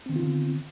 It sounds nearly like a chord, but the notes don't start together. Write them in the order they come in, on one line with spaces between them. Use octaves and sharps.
C4 D#3 B3 F4 D3